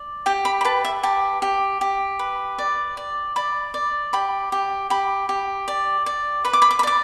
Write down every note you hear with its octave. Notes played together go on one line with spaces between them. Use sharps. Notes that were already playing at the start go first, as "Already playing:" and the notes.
Already playing: D5
G4 G5
B5
B5
B4 A5
E5
G4 A5
G4
G4
B4
D5
D5
D5 B5
D5
G4 B5
G4
G4 B5
G4
D5
D5
B4 B5
D6
B5
D6
B5
D5 D6